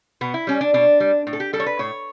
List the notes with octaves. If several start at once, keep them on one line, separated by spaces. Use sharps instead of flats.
B2 B3
E4
G3 C#4
D4
B2 D4
G3
A2
A4
G4
G3 A4
C#5
B4
A2 C#5